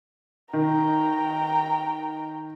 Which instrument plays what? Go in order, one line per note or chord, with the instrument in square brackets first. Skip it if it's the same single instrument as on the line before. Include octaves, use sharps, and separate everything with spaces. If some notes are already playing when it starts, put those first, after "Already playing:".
[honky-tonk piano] D#3 [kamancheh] G5 A#5